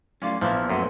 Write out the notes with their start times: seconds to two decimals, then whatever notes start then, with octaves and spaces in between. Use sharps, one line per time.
0.22 F#2 A2 F3 A#3 C#4 F4 D5
0.41 A#1 E2 E3 F3 A#3 A#4 E5
0.70 F#2 A3 B3 F4